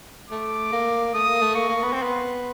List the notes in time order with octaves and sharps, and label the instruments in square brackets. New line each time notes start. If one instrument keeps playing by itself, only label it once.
[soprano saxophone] A3 [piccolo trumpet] D6
[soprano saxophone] A#3
[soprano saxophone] A3 [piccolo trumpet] D#6
[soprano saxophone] A#3
A3
[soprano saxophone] A#3 [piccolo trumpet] C#6
[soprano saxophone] A#3
B3
[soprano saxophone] C4 [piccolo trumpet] C6
[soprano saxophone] B3